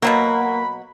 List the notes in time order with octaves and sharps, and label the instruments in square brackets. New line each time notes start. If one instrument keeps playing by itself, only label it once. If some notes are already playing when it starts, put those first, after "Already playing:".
[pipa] B2 F#3 F#4 [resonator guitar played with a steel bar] A#3 [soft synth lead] B5